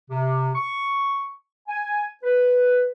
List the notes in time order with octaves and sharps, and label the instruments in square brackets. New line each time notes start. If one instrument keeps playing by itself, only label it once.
[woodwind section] C3
C#6
G#5
B4